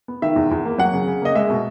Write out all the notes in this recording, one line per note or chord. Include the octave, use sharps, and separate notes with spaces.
B3
D#3 E5
E2
E2
A#3
F#3 F#5
C#3
C#3
A#3 D#5
G#3 E5
B2